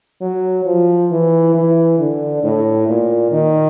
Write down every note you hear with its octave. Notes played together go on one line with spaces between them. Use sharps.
F#3
F3
E3
E3
D3
A2
A#2
D#3